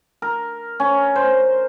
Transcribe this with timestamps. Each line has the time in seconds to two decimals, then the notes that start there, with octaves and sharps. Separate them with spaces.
0.22 A#4
0.80 C#4
1.16 C5